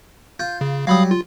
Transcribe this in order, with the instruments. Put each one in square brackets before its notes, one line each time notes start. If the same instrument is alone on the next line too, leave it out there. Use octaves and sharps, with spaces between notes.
[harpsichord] F4 [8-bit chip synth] G6
[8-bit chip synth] C#3
[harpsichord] F#3 G3 [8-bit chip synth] F5 B5 D#6
[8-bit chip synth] F4